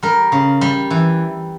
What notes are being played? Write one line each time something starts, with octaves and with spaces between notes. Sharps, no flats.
G3 A#4
C#3
G3
E3